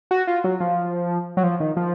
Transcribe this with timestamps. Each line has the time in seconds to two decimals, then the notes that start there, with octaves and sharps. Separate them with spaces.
0.11 F#4
0.27 F4
0.44 F#3
0.60 F3
1.37 F#3
1.44 F3
1.60 D#3
1.77 F3